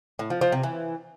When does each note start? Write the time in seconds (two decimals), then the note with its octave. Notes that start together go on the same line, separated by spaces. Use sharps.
0.19 A2
0.30 F3
0.41 F3
0.52 C3
0.63 E3